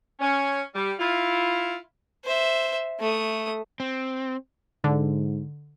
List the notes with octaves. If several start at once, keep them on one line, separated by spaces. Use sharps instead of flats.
C#4
G3
E4 F4
C5 E5
A3 D#6
C4
G#2 D3